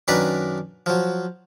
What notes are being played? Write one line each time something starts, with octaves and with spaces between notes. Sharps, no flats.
F#2 D#3 D4 B4 A#5 B5
F3 F#3